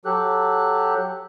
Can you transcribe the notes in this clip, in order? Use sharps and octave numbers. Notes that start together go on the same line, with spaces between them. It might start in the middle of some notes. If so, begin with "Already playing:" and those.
F#3 G4 A4 F#6